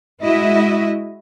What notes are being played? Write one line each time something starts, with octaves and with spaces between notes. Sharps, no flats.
G#3 E4 F#4 D#5 E5